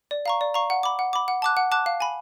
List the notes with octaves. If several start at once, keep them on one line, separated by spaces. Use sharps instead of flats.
D5
F5 A#5 C#6
D5
F5 A#5 C#6
F#5
B5 D6
F#5
B5 D6
F#5
A5 D6 F#6
F#5
A5 D6 F#6
F5
G#5 B5